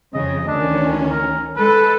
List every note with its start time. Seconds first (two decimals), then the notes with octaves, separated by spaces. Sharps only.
0.14 F2 C#3 D#5
0.48 D2 D#3 C#4 D4
1.11 A#4
1.56 G#3 A4 B4